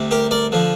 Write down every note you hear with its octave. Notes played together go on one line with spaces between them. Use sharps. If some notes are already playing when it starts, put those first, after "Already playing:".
Already playing: D2 C3 G3
G4 A#4
A#4 D5
D3 F3